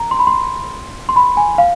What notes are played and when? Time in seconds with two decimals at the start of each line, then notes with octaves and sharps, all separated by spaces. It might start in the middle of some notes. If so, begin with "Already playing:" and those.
Already playing: A#5
0.11 C6
0.19 B5
0.27 C6
1.09 C6
1.16 B5
1.37 G#5
1.58 F5